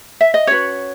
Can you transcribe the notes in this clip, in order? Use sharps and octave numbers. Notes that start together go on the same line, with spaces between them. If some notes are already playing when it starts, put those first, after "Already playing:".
E5
D#5
C#4 F#4 B4 C#5